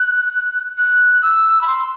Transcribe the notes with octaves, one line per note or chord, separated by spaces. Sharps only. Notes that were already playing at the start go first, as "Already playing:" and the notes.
Already playing: F#6
F#6
E6
B5
C6